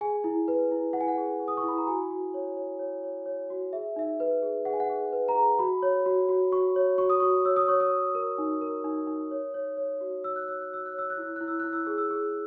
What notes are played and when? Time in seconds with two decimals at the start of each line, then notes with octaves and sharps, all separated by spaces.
0.01 G#4 G#5
0.24 E4
0.48 B4
0.71 E4
0.93 E4 F#5
1.01 G#5
1.08 F#5
1.18 G#4
1.40 G#4
1.48 D#6
1.57 C#6
1.63 E4
1.68 B5
1.78 A#5
1.87 F#4 G#5
2.11 F#4
2.34 C#5
2.57 C#5
2.79 C#5
3.04 C#5
3.26 C#5
3.50 F#4
3.73 G#4 E5
3.96 D#4 E5
4.20 B4
4.42 G#4
4.65 G#4 F#5
4.73 G#5
4.80 F#5
4.90 G#4
5.13 B4
5.28 A#5
5.35 G#4
5.59 F#4 B5
5.82 C#5
6.06 F#4
6.29 F#4
6.52 F#4 C#6
6.76 C#5
6.98 F#4 C#6
7.10 D#6
7.20 F#4 C#6
7.45 C#5 E6
7.56 D#6
7.68 C#5 C#6
7.80 D#6
7.92 C#5
8.15 A#4
8.38 D#4
8.61 A#4
8.84 D#4
9.07 D#4
9.31 C#5
9.54 C#5
9.77 C#5
10.01 F#4
10.24 C#5 E6
10.36 F#6
10.48 C#5 E6
10.62 F#6
10.71 F#4 E6
10.86 F#6
10.94 C#5 E6
11.10 F#6
11.18 E4 E6
11.36 E4 F#6
11.48 E6
11.60 E4 F#6
11.73 E6
11.85 G#4 F#6
11.98 E6
12.11 G#4